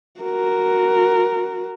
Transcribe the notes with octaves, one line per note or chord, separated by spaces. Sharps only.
F#4 A#4